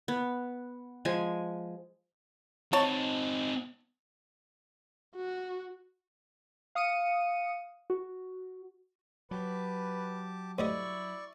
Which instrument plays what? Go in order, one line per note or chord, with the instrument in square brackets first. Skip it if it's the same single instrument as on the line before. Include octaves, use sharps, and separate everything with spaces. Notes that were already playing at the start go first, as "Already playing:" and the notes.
[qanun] B3
F3 G#3 G#5
[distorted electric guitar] C4 D#4 [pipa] C#5 A5
[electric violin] F#4
[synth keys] F5 D#6 C#7 D#7
F#4
[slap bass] F#3 [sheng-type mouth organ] G4 A5 D6 [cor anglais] B4
[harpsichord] D2 G3 D#5 [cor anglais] E4 [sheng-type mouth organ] D5 C#6